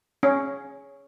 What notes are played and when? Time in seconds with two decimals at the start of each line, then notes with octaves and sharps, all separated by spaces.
0.23 C#4